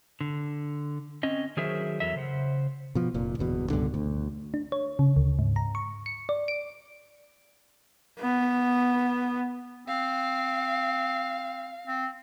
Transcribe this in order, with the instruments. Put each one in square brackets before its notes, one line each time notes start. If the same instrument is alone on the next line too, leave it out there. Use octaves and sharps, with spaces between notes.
[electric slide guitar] D3
C4 C#4 D#5
D#3 F#3 G#4 A#4 C5 E5
E2 F#3 A4 E5
C#3 C5 F#5
[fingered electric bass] B2 F3
F1 A#2
G1 E2 B2
C#2 G2 B2 D3
D2
[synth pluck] D4
C#5
C#3
D2
G#2
A#5
C#6
C#7
D5
D7
[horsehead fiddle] B3
[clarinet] C4 [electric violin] F5
[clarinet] C4